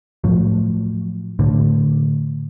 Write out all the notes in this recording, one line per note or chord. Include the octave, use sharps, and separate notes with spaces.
A2 F3 F#3
A2 D3